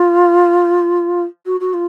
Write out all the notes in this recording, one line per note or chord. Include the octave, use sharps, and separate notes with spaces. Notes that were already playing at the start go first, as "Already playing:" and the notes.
Already playing: F4
F#4
F#4
F4